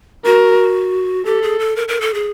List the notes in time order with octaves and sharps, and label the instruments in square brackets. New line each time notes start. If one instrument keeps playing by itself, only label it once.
[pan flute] F#4 [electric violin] A#4
[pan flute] G4 [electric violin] A4
[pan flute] G#4
A4
A#4
A#4
A4
G#4